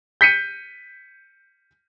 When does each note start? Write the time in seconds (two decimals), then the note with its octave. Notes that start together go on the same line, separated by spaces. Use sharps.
0.21 G6 B6 C#7 D#7